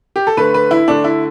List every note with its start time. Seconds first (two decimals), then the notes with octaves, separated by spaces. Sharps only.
0.16 G4
0.27 A4
0.37 D3 A3 B4
0.54 B4
0.71 E4
0.88 D3 A3 D4
1.04 E4